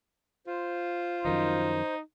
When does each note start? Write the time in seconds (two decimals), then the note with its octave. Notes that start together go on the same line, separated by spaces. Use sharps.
0.47 F4 C5
1.25 F#2 D#3 F3 D#4